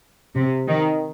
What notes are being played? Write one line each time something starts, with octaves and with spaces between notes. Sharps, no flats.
C3
D#3